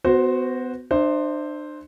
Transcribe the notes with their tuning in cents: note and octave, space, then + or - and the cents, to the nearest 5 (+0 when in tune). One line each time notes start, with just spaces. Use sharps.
B3 +30 F#4 +0 C5 +0
D4 +40 C5 +0 E5 +0